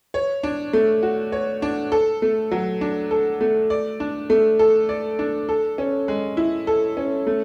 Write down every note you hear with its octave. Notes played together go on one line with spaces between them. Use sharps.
C#5
D4
A3
F#4
C#5
D4
A4
A3
F#3
D4
A4
A3
D5
D4
A3
A4
D5
D4
A4
C#4
G#3
E4
A4
C#4
A3